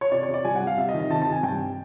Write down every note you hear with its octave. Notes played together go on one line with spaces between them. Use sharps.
C#5
C3 D5
C#5
C3
D5
G3 G#5
F#5
G3
F5
C3 E5
D#5
D#3
D#5
C3 A5
A5
C3
G#5
G2 G5